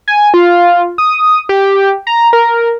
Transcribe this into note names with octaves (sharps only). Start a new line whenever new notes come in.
G#5
F4
D#6
G4
A#5
A#4